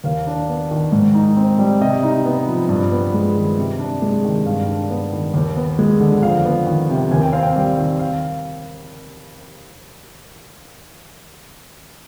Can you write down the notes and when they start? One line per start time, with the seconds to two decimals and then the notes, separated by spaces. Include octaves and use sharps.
0.04 D#2 F5
0.27 D4
0.49 B3
0.71 D#3
0.92 G#2
1.14 D#4
1.37 C4
1.59 G3
1.81 C3 D#5
2.03 D#4
2.25 B3
2.47 F3
2.69 G2
2.91 B3
3.14 G#3
3.35 D#3
3.57 C3
3.79 D4
4.02 G#3
4.25 D#3
4.46 G2 F5
4.68 D4
4.90 B3
5.13 D#3
5.34 D#2
5.57 B3
5.79 G#3
6.00 D3
6.22 F2 F5
6.45 B3
6.67 D#3
6.90 C3
7.11 D#2 G#5
7.21 G5
7.33 C4 F5
7.43 G5
7.56 G3
7.78 D#3
7.99 F5